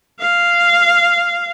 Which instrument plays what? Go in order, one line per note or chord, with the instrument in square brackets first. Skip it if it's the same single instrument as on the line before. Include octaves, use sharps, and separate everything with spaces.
[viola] F5